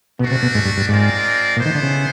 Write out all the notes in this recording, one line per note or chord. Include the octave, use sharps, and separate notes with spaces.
B2 A3 D4 F#4
C3
B2
G#2
G2
G2
G#2 G#3 C4 F4 A#4 D5
A#2 B3 E4 A4 C5
D#3
D3
C#3